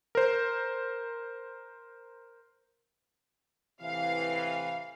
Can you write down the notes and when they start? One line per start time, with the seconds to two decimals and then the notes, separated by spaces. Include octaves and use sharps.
0.15 A#4 C5
3.81 A2 C3 E3 F5